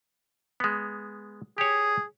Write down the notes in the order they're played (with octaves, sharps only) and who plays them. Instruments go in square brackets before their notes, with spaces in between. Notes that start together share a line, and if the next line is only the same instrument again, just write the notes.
[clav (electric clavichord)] G#3 B3
[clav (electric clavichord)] G4 C#5 [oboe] G#4